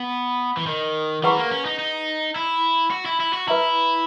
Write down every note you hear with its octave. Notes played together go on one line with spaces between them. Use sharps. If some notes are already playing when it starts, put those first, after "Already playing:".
Already playing: B3
E3
D#3
E3 G#4 B4 F#5 A#5 C#6
A#3
C#4
D#4
D#4
E4
F#4
E4
E4
F#4
E4 B4 E5 A#5